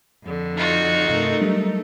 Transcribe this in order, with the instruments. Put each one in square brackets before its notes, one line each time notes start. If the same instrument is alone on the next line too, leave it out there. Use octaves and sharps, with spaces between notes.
[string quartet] F2 D3
[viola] D#4 [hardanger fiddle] F4 F#4
[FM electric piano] G2 C3 F5 [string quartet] A3 A4 A#4
[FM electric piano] F#3 G3 D4